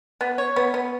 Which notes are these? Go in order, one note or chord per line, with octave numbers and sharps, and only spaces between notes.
B3
C#5
B3
B3